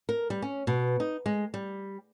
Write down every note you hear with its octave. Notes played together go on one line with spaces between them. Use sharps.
A#4
G3
C#4
B2
D#4
G#3
G3